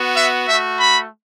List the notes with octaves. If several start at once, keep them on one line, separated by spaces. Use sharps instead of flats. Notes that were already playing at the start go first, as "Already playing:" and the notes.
Already playing: B3 F#4
E5
A3 F#4 E5
B5